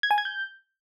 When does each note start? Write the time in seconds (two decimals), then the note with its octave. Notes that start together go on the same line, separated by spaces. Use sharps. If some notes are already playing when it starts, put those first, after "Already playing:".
0.03 G#6
0.11 G#5
0.18 G#6
0.25 G6